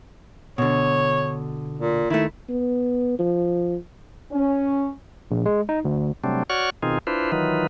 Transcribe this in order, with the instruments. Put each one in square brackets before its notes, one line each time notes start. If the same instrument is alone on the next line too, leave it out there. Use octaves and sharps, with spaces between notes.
[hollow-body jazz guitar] B2 D3 [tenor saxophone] C#5
[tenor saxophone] A#2
[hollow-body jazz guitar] D#3 A3 [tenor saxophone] E4
[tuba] B3
F3
[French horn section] C#4
[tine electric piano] A#1
G#3
D#4
D2
[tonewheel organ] C3 F#3 G3 A3 C4 D4
F#4 C#5 D5 F#5 C#6 F6
B2 D#3 C4 D#4 F4 G#4
D4 E4 F4 B4 C5
D#3 E3 F#3 D#4 F4 B4